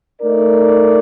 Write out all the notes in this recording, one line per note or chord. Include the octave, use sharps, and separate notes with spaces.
A3 D#4 A#4 D5